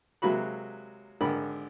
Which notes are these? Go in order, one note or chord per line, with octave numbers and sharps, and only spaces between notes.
C3 F#3 G#3 A#3 F#4 B5
G#1 D3 A#4 B5